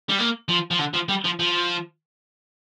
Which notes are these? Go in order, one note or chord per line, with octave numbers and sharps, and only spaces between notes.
G3
A#3
F3
F3
D3
F3
G3
F3
F3